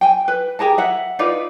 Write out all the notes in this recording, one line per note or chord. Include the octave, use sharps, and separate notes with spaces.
G5 G#5
B4
G4 G#4 A#4 A5
E5 F#5
D#4 F4 B4 D5